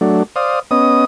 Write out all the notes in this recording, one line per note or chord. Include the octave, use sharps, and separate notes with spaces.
F#3 A3 D4
C5 D5 F5 D#6
B3 C#4 D#5 D#6